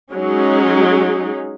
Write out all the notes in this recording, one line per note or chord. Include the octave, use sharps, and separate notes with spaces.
F#3 G#3 C#4 D#4 G#4